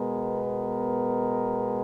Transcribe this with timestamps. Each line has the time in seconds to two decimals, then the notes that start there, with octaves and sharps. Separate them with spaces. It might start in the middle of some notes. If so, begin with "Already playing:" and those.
Already playing: B2 G#3 B3 A#4
0.47 A#4